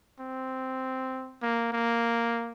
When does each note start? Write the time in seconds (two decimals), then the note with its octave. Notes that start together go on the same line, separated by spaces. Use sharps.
0.20 C4
1.42 A#3
1.72 A#3